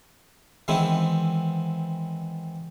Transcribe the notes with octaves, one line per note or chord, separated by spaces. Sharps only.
D#3 E3 G#3 B3 C4 E4